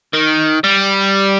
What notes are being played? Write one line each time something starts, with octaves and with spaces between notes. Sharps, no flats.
D#3
G3